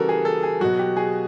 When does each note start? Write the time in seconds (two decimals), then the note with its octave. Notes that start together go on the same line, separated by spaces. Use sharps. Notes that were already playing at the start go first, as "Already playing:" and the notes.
Already playing: C#3 E3 G3 F#4 A4 A#4
0.09 G#4
0.25 A4
0.43 G#4
0.60 B2 F#3 F#4
0.79 G4
0.97 G#4